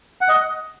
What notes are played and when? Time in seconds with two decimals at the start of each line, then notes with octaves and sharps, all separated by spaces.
0.21 F#5
0.29 D#5